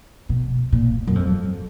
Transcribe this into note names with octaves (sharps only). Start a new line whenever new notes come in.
B2
A#2
F#2
F2